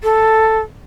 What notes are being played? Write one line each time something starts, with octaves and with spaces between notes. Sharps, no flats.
A4